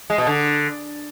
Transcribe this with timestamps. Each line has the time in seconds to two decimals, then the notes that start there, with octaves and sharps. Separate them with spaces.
0.10 G#3
0.18 B2
0.27 D3